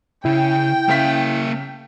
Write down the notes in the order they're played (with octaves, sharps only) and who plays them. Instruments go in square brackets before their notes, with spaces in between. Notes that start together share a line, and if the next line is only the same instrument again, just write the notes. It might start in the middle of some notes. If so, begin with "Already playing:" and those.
[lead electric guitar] C#3 [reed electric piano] E4 [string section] G5
[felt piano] C#3 B6 [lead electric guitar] A#3 E5